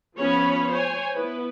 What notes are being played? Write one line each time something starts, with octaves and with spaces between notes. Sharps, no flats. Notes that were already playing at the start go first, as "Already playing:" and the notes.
F3 B3 C#4 C#5 B5
C5 C#5 G#5
B3 E4 B4